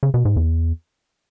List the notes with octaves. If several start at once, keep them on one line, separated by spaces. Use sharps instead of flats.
C#3
B2
G#2
E2